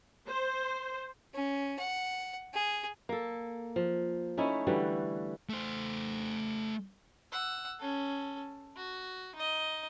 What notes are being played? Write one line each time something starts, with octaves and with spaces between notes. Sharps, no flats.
C5
C#4
F#5
G#4
A#3 A4
F3
A3 C#4 D#4 E4
D3 E3 G3 F#4
A3 C5
F#5 E6
C#4 A4
F#4
D#4 D#5